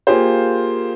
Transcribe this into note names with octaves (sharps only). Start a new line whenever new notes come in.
A#3 F4 G4 G#4 C5